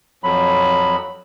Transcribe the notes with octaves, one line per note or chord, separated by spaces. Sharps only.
F2 F#3 B5